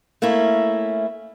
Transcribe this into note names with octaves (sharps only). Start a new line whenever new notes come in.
A3 A#3 C#4 E4